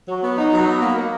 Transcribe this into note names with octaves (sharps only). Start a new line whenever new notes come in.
F#3
B3
D#4
F#3
B3
A#3
A#3